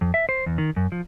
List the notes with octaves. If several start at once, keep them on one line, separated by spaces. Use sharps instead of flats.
F2
E5
C5
E2
D#3
F#2
F3